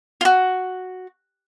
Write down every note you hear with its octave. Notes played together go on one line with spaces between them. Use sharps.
F4 F#4